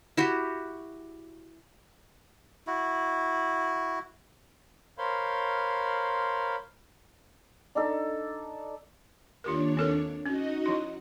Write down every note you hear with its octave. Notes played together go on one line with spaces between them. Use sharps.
E4 F#4 G4
E4 F#4
A#4 C5 C#5 F5 B5 C6
D4 D#4 A4
D#2 D4 F4 G4 A#4 C#5
C4 A4 A#4
C#4 D#4 F#4 D#5
F3 E4